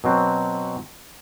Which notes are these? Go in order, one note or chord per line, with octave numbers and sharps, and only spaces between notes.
B2 F#3 C4